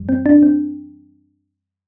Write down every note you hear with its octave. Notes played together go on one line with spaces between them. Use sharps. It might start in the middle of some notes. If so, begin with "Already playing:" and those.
Already playing: F#2 E3 G3
C4
D4
C4